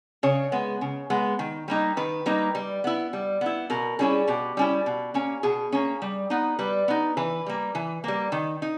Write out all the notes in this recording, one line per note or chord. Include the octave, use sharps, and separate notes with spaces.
C#3 C#5
G#3 B3
C#3
G#3 B3
D#3
G3 A#3 D#4
D#3 B4
G3 A#3 D#4
G3
B3 E4
G3
B3 E4
B2 A#4
G3 C#4 E4 G#4
B2 G4
G3 C#4 E4
B2
A#3 C#4
B2 G#4
A#3 C#4
G3
B3 D#4
G3 B4
B3 D#4
E3 B4
G3 A#3
E3
G3 A#3
D#3
D#4